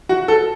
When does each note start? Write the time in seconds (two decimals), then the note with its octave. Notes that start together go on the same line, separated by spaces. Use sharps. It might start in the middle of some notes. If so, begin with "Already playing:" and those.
0.09 F#4
0.28 A4